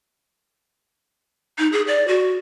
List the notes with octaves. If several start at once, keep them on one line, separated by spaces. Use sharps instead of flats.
D#4
G#4
D5
F#4